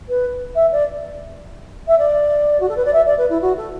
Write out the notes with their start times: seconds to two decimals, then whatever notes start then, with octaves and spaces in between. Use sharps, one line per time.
0.09 B4
0.55 E5
0.72 D5
1.88 E5
1.99 D5
2.60 F#4
2.69 A4
2.77 B4
2.85 D5
2.93 E5
3.06 D5
3.18 B4
3.30 E4
3.42 F#4
3.57 A4